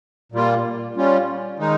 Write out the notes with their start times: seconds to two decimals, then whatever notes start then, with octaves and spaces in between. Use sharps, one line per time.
0.32 A#2 G3 A#3 F4
0.96 G3 C#4 F4
1.59 D#3 G#3 D#4